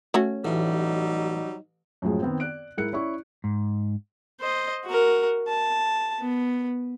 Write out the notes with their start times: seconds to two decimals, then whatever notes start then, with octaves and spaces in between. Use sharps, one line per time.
0.14 A3 C#4 F#4
0.45 A1 F#3 G3 D#4
2.02 F#2 A2 F3 G#3
2.22 D#3 B3 C4
2.40 D5 F#6 D7
2.78 G#2 E4 A#4 F#6 C#7
2.93 C#4 E4 D5 C#6
3.44 G#2
4.41 C5 D#5
4.85 F#4 A#4
5.47 A5
6.20 B3